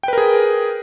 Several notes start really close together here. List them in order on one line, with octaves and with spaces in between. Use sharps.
G5 B4 A#4 G#4